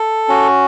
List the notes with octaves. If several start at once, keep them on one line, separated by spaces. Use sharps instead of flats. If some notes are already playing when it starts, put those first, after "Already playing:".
Already playing: A4
C#4 F#4